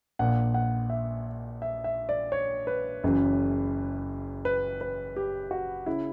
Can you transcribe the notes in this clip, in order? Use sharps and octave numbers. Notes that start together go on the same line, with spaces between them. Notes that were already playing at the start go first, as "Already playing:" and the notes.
A#1 A#2 F#5
F#5
E5
E5
E5
D5
C#5
B4
F#1 F#2 C#3 E3
B4
B4
G4
F#4
C#3 E4